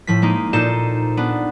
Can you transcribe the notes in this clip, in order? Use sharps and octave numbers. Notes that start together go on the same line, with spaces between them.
A2 F3 B6
G#3 A#3 D#4
A#2 D#4 A4 C5 E7
B3 D4